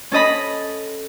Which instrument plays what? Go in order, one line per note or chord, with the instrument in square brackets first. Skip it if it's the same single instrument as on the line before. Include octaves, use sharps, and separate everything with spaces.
[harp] C#4 A4 D#5 B5